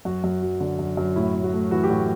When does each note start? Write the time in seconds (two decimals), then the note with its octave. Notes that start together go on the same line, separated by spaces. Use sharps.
0.05 F#2 F#4
0.24 F#2
0.42 F#3
0.60 D3
0.79 F#2
0.97 F#2
1.16 A2 E4
1.35 A2
1.44 F#4
1.53 A3
1.71 E3 F#4
1.84 G4
1.90 A2 F#4